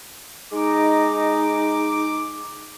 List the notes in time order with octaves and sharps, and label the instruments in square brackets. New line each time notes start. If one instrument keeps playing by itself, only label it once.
[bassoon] G#3 [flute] D#4 [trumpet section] D6